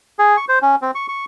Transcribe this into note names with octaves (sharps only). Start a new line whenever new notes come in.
G#4
C#6
C5
C#4
C4
C#6
C#6